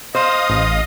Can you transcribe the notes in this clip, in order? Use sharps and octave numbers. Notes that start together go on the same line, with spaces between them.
C5 D#5 F5 D#6
A1